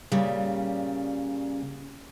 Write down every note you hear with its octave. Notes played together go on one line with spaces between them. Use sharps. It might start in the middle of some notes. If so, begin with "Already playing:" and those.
A#2 C#3 G3